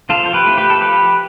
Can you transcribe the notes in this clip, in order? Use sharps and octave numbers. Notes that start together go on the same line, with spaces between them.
F3 F4 A4
C5
G4 B4
A3 C4 E4
G4 B4
A4
F3 G4 B4